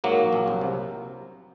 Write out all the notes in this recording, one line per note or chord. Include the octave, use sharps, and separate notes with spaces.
G#2 F#3 A#3
A#1
A#1
C2
C3